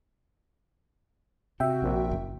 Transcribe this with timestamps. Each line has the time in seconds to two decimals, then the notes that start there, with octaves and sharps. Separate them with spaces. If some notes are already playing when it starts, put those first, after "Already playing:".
1.60 C3 F#4 E5 G5
1.82 A#1
2.11 F#1